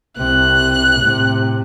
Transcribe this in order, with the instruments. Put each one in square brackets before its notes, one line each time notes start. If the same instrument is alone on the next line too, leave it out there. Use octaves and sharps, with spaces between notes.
[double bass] C2 C3 [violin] F#6
[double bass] A2 C3